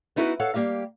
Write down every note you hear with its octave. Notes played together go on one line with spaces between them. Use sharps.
B3 D#4 E4 F#4 G#4 B4
A4 C#5 F5 F#5
G3 A#3 G4 F5